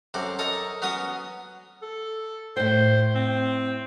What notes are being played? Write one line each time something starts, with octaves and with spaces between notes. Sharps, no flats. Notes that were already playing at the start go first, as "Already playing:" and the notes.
F#2 C4 A4 D6
A4 A#4 C#5 D#5 A5 A#5
F#3 B3 C#4 C#5 D#6
A4
A2 C5 G5
C4